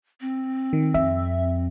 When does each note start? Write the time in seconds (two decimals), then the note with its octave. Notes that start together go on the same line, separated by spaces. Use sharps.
0.21 C4
0.73 D#3
0.94 F2 E5